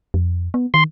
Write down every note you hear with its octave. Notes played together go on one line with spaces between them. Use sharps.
F2
B3
D#3 C6